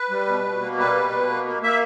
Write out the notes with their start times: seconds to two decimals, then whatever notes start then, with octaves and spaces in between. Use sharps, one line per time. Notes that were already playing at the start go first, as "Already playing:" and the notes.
Already playing: B4
0.10 G3
0.27 B2
0.44 B2
0.61 A#3
0.78 G3 B4
0.95 B2
1.12 B2
1.28 A#3
1.46 A#3
1.63 A#3 E5